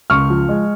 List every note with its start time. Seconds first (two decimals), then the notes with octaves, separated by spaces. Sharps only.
0.10 C#2 C#6 F6
0.30 F3
0.49 G#3